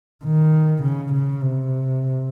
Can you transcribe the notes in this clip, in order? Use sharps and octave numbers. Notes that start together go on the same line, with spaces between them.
D#3
C#3
C#3
C3